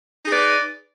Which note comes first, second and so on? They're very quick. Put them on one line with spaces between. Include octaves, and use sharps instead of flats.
D#4 G#4 D5 B4